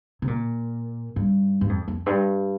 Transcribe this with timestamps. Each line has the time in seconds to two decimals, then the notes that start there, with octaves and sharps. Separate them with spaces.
0.22 C3
0.28 A#2
1.16 G2
1.61 G2
1.69 F2
1.88 F2
2.06 G2